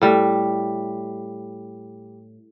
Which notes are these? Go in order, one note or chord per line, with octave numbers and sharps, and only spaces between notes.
A2 G3